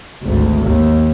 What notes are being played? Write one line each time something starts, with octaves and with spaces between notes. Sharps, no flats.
G#1 D2
D#2